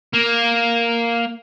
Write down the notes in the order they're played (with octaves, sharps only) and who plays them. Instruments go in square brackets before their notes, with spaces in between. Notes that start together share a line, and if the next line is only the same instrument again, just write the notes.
[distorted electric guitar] A#3